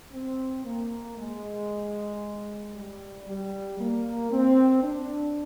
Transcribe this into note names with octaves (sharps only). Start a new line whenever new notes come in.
C4
A#3
G#3
G3
G3
A#3
C4
D4